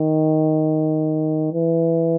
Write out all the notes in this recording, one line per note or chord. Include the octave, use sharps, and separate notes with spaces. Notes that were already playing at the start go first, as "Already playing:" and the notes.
Already playing: D#3
E3